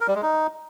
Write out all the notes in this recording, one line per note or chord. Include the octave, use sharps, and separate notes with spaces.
A#4
G3
G#3
D#4